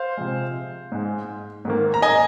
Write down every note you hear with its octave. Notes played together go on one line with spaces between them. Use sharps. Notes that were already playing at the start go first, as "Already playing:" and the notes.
Already playing: C5 F5
C3 F3 G#3
G#2 G#3
G#2 D#3 A#3
A#5
D#5 G#5